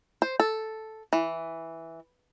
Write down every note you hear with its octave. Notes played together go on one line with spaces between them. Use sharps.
C5
A4
E3